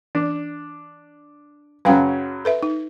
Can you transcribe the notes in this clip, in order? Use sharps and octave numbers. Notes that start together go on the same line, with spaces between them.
E3 D4
F#2 C#3 F#3 B4 F5 G5
A4 B4 E5
D#4